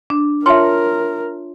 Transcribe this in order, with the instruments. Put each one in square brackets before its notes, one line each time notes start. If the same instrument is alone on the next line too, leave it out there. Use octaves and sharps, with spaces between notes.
[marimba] D4
[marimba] F4 C#5 [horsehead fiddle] A#4 [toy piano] E5 A5 C6